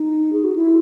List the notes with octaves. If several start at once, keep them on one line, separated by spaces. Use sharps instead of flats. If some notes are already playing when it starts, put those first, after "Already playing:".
Already playing: D#4
G#4
F#4
E4